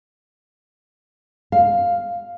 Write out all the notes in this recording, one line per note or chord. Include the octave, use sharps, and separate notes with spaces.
F5